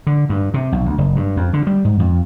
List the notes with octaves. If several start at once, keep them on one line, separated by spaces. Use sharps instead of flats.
D3
G2
C3
B1
D2
F#1
G2
F2
D3
G3
G#2
F2